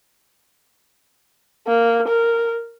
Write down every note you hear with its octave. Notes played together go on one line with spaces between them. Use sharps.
A#3
A#4